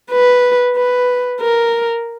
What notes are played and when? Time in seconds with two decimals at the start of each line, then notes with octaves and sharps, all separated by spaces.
0.11 B4
0.76 B4
1.41 A#4